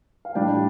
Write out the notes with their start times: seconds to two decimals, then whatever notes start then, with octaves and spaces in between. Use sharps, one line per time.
0.25 F5
0.35 A2 G3 D4 G5